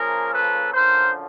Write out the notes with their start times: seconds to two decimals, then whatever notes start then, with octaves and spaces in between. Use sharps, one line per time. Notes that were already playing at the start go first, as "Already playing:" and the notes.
Already playing: C#3 F3 A#3 G#4 A#4
0.33 A4 B4
0.73 F#2 D3 F3 A#4 C5